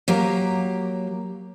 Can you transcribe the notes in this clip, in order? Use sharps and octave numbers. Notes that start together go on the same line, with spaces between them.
F#3 A#3 G4 A#5